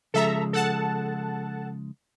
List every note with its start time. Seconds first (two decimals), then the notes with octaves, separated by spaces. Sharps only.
0.14 C#3 F3 G#3 A4 E5 A#5
0.53 A4 F#5 A5